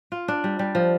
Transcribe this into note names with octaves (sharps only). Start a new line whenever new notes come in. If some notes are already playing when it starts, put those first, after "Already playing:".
F4
D4
G3
G3
F3